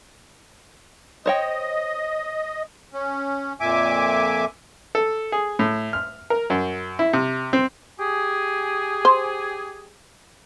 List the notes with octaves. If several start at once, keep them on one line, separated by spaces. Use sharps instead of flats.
C5 C#5 D#5 G5
C#4
F2 A#2 E5 G#5 D6
A4
G#4
A2
F6
A#4
F#2
E4
C3
C4
G4 G#4
C5